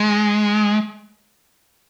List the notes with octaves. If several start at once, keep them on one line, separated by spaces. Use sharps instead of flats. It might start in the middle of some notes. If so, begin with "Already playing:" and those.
Already playing: G#3